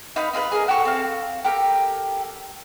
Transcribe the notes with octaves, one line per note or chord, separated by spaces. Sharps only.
D#4 B4 F5 G6
D#4 F4 A4 B4
G#4 A#4
F#4 G4 A4 C#6
C4 F5
G4 A4 A#4 G5